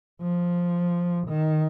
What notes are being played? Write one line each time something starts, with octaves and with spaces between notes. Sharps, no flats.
F3
D#3